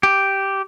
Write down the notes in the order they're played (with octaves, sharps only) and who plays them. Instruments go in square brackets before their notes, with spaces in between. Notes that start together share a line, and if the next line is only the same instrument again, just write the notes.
[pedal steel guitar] G4